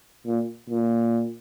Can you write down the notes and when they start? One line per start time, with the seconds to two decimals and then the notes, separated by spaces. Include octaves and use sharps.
0.26 A#2
0.70 A#2